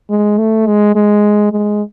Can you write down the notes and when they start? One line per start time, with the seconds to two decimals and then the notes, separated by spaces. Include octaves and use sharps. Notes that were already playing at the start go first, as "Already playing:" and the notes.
0.10 G#3
0.38 A3
0.67 G#3
0.95 G#3
1.52 G#3